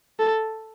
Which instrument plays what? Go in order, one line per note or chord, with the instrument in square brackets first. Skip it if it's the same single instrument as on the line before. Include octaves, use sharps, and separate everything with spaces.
[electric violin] A4